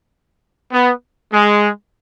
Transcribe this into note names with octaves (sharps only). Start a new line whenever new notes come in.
B3
G#3